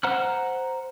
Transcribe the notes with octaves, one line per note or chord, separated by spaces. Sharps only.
C5 F#5 A#5 F6 F#6